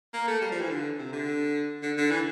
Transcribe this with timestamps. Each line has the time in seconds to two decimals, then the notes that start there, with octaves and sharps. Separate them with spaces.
0.14 A#3
0.27 A3
0.41 G3
0.51 F3
0.61 E3
0.70 D3
0.99 C3
1.13 D3
1.82 D3
1.98 D3
2.11 E3